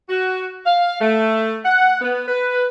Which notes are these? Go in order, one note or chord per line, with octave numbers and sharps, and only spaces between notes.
F#4
F5
A3
F#5
B3
B4